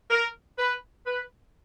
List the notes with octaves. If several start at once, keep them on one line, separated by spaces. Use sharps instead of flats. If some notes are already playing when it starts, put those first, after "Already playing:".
A#4
B4
B4